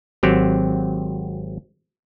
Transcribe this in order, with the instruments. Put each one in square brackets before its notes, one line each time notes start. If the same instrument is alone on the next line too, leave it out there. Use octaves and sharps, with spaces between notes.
[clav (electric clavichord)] G#1 F#3 C4 G4